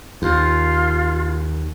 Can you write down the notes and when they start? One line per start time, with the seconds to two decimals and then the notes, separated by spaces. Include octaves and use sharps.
0.22 D#2 F4